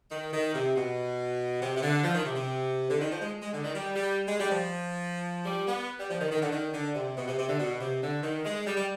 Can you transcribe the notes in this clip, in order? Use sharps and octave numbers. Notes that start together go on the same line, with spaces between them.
D#3
D#3
C3
B2
C3
C3
D3
F3
D#3
C3
C3
D3
D#3
F3
G#3
G#3
D3
D#3
G3
G3
G#3
G3
F3
G3
B3
G3
F3
D#3
D#3
D3
D#3
D3
C3
B2
C3
C3
D3
B2
C3
D3
D#3
G#3
G3
G3